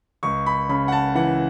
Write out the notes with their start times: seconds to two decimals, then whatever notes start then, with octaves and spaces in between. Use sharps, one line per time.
0.23 C#2 C#6
0.46 B5
0.69 C#3 B5
0.88 F#5
0.92 A5
1.15 E3 F#5